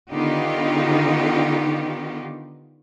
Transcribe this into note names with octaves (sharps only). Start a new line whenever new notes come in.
D3 D#3 B3 D#4 F4 G4